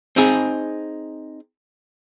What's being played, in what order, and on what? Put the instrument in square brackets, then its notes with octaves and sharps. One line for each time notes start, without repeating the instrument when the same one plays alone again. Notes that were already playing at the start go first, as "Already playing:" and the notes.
[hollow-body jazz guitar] C4 D#4 G#4